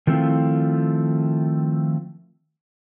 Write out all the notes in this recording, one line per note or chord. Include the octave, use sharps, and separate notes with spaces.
D#3 F3 A3 C4 E4 F4